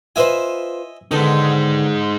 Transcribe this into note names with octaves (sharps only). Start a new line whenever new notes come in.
F4 B4 C5 D#5 E5 G#5
D3 D#3 G#3 B3 D#4 A4